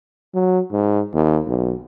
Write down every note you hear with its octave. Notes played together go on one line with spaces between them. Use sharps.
F#3
G#2
D#2
B1